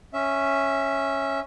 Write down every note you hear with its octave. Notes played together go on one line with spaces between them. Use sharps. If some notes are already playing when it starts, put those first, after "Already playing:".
C#4 E5